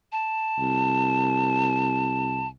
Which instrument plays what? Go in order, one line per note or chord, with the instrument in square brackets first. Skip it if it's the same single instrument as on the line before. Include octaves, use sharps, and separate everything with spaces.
[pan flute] A5
[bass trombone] C2